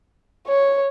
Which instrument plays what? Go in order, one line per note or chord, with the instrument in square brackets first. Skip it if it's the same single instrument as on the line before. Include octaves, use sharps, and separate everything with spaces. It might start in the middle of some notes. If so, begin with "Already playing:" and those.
[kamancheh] C#5